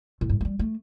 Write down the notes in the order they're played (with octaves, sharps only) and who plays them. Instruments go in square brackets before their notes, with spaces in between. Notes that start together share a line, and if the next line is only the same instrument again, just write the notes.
[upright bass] A2
G2
A3
G3
A3